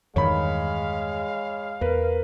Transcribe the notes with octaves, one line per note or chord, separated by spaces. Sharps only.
E2 G2 D#3 G#3 C#5 F5 B5
E2 A#4 B4